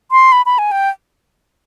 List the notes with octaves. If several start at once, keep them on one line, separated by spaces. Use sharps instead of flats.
C6
B5
B5
G#5
G5